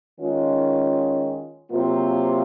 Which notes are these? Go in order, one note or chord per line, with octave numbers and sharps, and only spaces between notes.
D#3 G#3 C#4 F4
C3 F#3 A#3 F4